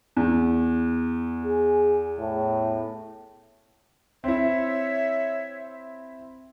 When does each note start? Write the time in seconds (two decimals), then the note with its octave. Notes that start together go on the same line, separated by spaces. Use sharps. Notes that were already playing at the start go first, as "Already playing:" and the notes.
0.17 E2
1.45 G#4
2.19 A2
4.24 C4 E4 C#5 E5